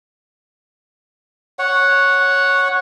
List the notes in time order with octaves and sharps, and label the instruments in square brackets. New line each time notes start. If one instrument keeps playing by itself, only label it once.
[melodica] C#5 F#5